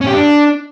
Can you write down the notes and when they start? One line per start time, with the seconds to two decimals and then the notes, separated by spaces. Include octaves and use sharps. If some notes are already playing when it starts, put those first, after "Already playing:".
0.01 C#4
0.07 G4
0.13 D4